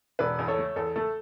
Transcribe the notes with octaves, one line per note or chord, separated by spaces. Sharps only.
E1 B4 D5
E2
A4 C#5
A3
E2 A4
A3 A4